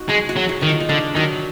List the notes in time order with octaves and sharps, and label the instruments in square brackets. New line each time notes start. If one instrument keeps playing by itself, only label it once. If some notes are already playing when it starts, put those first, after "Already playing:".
Already playing: [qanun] D#4 F#4
[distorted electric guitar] G#3 [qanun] G#4
[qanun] F#4
[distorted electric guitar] F#3
[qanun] F#4
[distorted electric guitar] D#3 [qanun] D#4
[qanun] F4
D#4
[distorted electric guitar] D3 [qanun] D4
[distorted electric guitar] D#3 [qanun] F#3